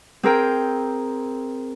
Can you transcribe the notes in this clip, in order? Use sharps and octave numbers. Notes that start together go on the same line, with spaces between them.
C4 G#4 A#4 G5